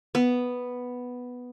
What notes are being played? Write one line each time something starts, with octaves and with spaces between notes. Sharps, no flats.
B3